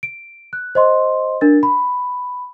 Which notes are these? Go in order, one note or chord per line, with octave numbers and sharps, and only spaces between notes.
D7
F#6
C5 D#5 C6
D4 A#4 A6
B5